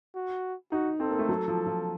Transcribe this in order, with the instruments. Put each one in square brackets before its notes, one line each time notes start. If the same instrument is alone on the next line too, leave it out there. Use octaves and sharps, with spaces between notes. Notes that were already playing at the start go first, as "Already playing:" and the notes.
[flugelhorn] F#4
[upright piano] D#4 [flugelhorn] F#4
[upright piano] C4 [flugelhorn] A4
[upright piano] A#3
A3
F#3
F3
F3